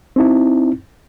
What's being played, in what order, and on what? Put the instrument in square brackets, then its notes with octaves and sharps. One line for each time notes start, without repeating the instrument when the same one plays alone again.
[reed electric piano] C4 D#4 E4